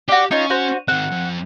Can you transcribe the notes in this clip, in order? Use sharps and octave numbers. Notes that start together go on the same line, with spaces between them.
D4 F#4 G4
C#4 D#4 F4 C#5
F#4 C5
D#3 C4 F#5
F2